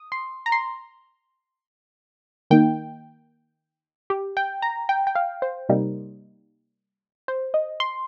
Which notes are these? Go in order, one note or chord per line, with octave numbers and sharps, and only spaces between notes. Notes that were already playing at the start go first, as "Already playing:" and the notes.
Already playing: D#6
C6
A#5
C6
D#3 A#3 D#4 G5
G4
G5
A#5
G5
G5
F5
C5
C3 G3 A#3 D#4
C5
D#5
C6